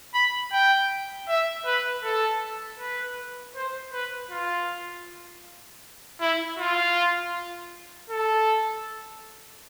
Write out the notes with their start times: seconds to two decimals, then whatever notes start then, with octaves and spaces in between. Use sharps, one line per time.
0.14 B5
0.52 G5
1.28 E5
1.66 B4
2.04 A4
2.80 B4
3.56 C5
3.93 B4
4.31 F4
6.21 E4
6.59 F4
8.10 A4